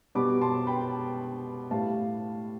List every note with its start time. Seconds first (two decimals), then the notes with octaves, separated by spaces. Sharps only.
0.15 B2 G3 B5 D6
0.41 A5 C6
0.67 G5 B5
1.71 A2 G3 F5 A5